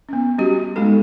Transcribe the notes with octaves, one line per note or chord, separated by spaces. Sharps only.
B3 C#4
G3 C#4 F#4 G4
G#3 B3 D#4 A4